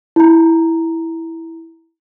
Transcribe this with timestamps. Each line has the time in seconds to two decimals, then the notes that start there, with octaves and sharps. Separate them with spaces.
0.16 E4 A#5